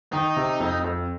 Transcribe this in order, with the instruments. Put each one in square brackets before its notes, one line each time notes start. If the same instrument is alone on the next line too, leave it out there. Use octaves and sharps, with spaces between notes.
[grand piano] D#3 [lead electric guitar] D#4
[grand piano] C3
F2
F2